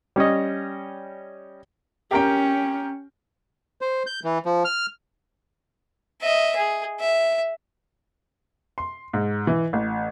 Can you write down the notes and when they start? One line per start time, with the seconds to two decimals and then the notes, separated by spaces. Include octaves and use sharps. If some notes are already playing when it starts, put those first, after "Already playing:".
0.16 G3 C#4 C#5 D#5
2.11 C#4 G4 A#4 G5
3.81 C5
4.06 G6
4.24 E3
4.45 F3
4.65 F6
6.22 D#5 E5
6.56 G#4
7.00 E5
8.78 C6
9.13 G#2
9.47 E3
9.73 A1